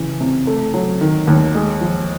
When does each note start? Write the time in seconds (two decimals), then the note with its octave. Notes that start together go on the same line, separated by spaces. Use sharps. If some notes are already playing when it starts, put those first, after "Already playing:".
Already playing: C#3 E3
0.21 C3
0.47 A3
0.74 F#3
1.01 D#3
1.27 D#2
1.55 G#3
1.81 F3